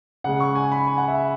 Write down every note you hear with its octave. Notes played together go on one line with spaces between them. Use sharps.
C#3 G#3 F#5
C#6
G#5
B5
G#5
F#5
E5